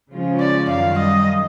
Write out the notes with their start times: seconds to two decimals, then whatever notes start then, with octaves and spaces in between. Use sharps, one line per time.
0.11 C#3 F3 G#3 C#4 F4
0.40 D5
0.70 F#2 D#3 G3 F5
0.98 D#5